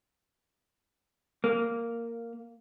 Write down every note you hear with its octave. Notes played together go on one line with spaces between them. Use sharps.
A#3